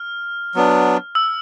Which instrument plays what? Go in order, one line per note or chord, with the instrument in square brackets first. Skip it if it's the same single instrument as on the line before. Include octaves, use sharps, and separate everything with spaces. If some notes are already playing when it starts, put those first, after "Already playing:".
Already playing: [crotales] F6
[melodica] F#3 B3 D4
[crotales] E6